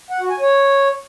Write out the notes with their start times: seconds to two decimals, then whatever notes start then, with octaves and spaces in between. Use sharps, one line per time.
0.10 F#5
0.20 F#4
0.30 G#5
0.40 C#5